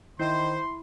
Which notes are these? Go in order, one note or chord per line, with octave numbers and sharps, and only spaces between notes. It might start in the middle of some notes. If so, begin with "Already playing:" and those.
D#3 E4 C5 C6